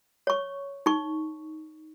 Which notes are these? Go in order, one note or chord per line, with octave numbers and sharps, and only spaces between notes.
C#5 C#6
D#4 C#6